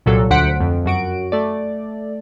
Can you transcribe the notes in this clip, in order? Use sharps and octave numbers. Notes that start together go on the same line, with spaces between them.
C2 A#2 F#3 A4
D2 D3 C5 F#5 B6 D7
F2
F#2 F#4 D7
A3 D5